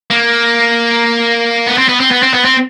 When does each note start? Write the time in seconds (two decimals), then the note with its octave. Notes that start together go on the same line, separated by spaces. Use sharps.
0.11 A#3
1.67 B3
1.78 C4
1.89 B3
2.00 C4
2.11 B3
2.23 C4
2.34 B3
2.45 C4